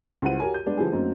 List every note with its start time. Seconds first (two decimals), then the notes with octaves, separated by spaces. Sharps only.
0.22 C#2 G3 E4 C5 F#5 D#7
0.40 F#4 G4 A#4 C#5 G#5
0.54 G6
0.66 G3 G#3 B3 D4 G4
0.77 D3 F3 G3 B3 E4 G#4
0.92 F#2 F#3 A3 A#3 C4 D#4